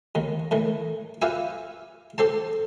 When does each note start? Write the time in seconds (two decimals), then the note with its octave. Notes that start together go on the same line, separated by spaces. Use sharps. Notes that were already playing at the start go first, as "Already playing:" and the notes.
0.15 D#2 D#3
0.51 A2 D#3 E3
1.22 F4 G4 B4 E5 G#5
2.18 G4 A4 C5 A5